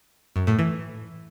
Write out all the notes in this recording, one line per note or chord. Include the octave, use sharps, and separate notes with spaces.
F#2
A2
E3